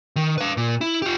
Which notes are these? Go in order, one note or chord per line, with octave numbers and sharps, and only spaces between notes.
D#3
B4 F5
A#2
E4
F4 G4